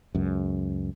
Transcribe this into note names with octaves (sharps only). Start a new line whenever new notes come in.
C#2 F#2